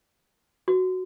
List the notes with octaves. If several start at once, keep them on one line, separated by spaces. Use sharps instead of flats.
F#4